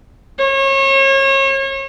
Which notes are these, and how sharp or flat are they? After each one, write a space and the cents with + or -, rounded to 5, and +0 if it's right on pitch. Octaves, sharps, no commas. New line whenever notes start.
C#5 -35